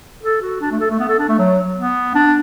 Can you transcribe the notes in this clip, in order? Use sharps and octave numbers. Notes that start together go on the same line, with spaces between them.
A4
F#4
D4
A3
A4
A3
B3
A4
D4
A3
F#3
B3
D4